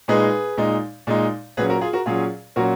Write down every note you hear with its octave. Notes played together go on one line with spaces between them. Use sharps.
A#2 G#3 D#4 G#4 B4
A#2 G#3 D#4
A#2 G#3 D#4
A#2 F#3 C#4 G#4 B4
F#4 A#4
F4 G#4
F#4 A#4
A#2 F#3 C#4 F4 G#4
A#2 F#3 C#4 F#4 A#4